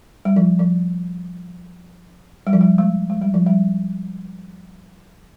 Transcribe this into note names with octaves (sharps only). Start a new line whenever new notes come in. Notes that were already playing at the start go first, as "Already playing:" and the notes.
G3
F3
F3
G3
F3
G3
G#3
G#3
G3
F3
G3